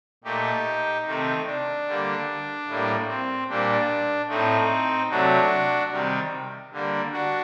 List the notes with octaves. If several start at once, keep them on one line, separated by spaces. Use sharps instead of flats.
A#2 A3 D#4 G4
C3 D#3 A3 C4 D#4
D4
D3 G3 A#3
A2 G3 A#3
C4
A#2 G3 A#3 D4
A2 A3 C4 D#4
C3 F#3 A3 D4 F#4
C3 D#3 G3
D3 G3 A#3
D4 F#4